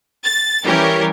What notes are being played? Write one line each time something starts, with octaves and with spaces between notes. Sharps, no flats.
A6
E3 G3 C#4 G4 A#4